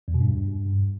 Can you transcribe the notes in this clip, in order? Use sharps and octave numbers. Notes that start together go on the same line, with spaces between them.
E2
B2
G2